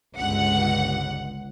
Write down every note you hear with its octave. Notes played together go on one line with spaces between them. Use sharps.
G1 C#2 F#5